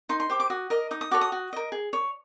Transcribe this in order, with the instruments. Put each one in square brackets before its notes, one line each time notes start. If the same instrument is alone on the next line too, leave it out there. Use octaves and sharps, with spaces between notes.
[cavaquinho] D#4 C6
C6
G4 C5 D6
D6
F#4 D#6
A#4 D#5
D#4 D#6
D#6
F#4 A4 C#5 D6
D#6
F#4
A#4 D#5
G#4
C#5